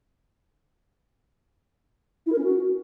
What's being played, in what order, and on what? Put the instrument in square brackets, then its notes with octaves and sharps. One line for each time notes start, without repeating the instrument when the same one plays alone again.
[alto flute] E4
A#4
C#4
F#4